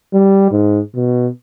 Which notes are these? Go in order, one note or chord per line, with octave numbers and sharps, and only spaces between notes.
G3
G#2
B2